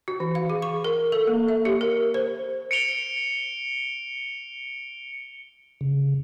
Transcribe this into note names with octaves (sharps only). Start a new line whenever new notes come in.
F#4
E3
F5
G#4
C#6
A#4
A4
A#3
E5
G4
A#4
C5
C#7 D7 F7 G7
C#3